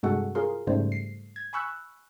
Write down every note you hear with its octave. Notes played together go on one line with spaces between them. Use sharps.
G2 C3 G#3 F#4 A4 F#5
F4 G#4 A#4 C6
G#2 C#3 G3 A3 C5
C7
G#6
G#5 B5 C#6 E6 F#6